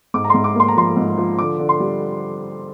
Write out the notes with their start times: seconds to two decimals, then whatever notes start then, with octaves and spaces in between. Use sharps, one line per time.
0.14 G#2 D6
0.24 A#5
0.30 G#2 C6
0.44 D6
0.55 A#3 C6
0.68 A#5
0.77 F3 C6
0.96 G#2
1.18 F3
1.39 D3 D6
1.59 D3
1.69 C6
1.80 G3